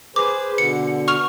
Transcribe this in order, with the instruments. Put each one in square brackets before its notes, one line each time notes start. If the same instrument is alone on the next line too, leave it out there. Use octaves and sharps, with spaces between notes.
[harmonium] G#4 B4 C5 [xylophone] D6
[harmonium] B2 D3 [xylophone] C#7
[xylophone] C#6 F6 F7